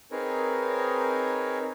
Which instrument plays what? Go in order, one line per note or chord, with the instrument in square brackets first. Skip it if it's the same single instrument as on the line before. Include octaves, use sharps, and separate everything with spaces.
[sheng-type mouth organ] C4 D#4 G#4 A#4 B4 C#5